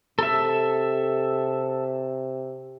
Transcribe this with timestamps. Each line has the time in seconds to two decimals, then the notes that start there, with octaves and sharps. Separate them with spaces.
0.19 C3 A4 E5